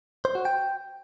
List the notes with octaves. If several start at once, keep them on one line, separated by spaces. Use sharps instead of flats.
C5
F#4
G5